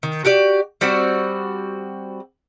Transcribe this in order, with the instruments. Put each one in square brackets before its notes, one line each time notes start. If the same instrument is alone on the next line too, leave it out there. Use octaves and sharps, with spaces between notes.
[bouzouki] D#3
F#4 G4 D5
G3 C4 F#4